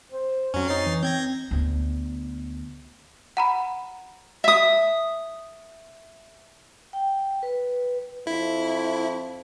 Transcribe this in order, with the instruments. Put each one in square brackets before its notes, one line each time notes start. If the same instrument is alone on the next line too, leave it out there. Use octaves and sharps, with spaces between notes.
[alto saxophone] C5
[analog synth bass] F2 [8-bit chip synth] F#3 C#4
[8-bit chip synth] D#4 A6 C7 [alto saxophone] C#5
[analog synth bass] E3
[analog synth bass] C4 [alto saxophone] G5 [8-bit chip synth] G6 G#6 A#6
[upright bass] D2 B3
[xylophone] F#5 A#5 B5
[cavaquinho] E5 D#6
[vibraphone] G5
B4
[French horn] F2 [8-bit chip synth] E4